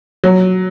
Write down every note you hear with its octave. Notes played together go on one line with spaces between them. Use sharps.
F#3